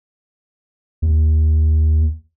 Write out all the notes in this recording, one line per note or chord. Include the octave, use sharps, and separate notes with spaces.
D#2